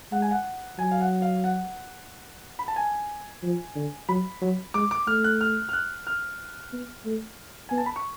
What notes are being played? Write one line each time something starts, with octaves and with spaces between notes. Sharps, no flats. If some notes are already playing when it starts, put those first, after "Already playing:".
G#3 F#5
G#5
F#5
F#3 G#5
F5
F#5
F5
F#5
B5
A5
G#5
F3
D3
F#3 B5
F#3
G#3 D6
D6
A3 F6
F#6
F6
F6
F#6
F6
B3
A3
B3 G#5
A5
B5
C#6